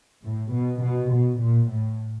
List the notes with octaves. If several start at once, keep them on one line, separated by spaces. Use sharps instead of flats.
A2
B2
B2
B2
A#2
A2